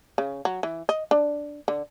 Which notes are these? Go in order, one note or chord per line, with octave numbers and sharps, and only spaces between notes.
C#3
F#3
E3
D#5
D4
D3